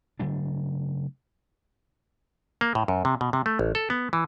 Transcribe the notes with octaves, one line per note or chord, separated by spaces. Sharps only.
C#3 F#3 A3 D4
A#3
A2
F#2
C3
B2
C3
A3
A1
A4
B3
E3